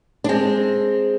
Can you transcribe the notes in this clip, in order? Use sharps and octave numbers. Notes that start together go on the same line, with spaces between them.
D4
G#3 C4